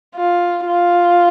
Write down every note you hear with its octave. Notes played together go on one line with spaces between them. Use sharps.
F4
F4